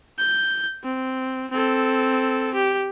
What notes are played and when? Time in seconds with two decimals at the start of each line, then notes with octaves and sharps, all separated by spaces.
0.18 G6
0.83 C4
1.51 C4 A4
2.54 G4